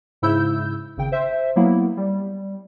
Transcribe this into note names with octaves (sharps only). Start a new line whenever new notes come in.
G#2 C#3 E4 E6 G6
G#1 C#3 G5
C5 E5
F#3 A#3 B3 E4
G3